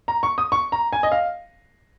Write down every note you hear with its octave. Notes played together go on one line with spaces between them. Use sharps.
A#5
C#6
D#6
C#6
A#5
G#5
D#5
F5